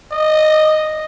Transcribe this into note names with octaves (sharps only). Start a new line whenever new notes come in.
D#5